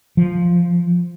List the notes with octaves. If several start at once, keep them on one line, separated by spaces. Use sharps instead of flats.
F3